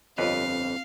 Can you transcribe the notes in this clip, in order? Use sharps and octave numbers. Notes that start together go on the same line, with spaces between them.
G1 F2 C4 F4 B4 C#5 D#5 F5